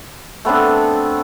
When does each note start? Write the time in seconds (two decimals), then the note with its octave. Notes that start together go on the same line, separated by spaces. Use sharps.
0.45 A3 B3 C4 D4